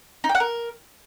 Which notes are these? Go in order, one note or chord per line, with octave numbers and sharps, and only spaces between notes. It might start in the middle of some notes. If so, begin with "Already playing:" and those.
D#4
G5
F#5
A#4